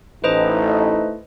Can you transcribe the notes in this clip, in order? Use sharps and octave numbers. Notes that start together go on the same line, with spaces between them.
A1 A3 D#4 E4 B4 C5 D#5